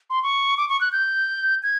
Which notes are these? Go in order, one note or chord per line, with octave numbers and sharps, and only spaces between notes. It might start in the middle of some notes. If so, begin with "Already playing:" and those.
C6
C#6
D6
C#6
F#6
G6
G#6